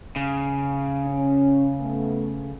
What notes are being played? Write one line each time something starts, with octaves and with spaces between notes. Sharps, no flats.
C#3
C#4
A3 B3